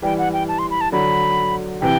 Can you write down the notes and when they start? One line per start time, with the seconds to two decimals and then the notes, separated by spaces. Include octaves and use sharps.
0.02 E3 G3 G5
0.18 F#5
0.33 G5
0.48 A5
0.59 C6
0.71 B5
0.81 A5
0.92 D3 F#3 B5
1.82 C3 E3 G5